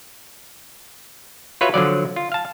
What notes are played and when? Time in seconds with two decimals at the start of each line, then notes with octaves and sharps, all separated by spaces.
1.61 F4 F#4 B4 C#5 E5
1.74 D3 F3 F#3 D5
2.16 F4
2.32 F5 A5